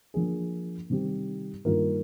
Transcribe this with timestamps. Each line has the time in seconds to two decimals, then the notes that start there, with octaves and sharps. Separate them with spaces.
0.14 F3 A#3 D4 G#4
0.90 C3 D#3 G3 C4 G4
1.65 G2 D#3 A#3 F4 A#4